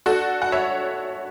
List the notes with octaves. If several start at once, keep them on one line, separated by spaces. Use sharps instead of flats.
D4 F#4 A4
F#5
C#5 E5